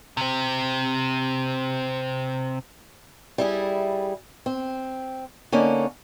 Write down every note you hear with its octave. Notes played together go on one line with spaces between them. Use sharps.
C3 C4
G3 E4 G#4
C4
D3 A#3 C#4 D#4